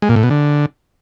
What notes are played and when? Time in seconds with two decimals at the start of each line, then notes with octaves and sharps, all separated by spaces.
0.02 G#3
0.09 A#2
0.16 A2
0.23 B2
0.30 D3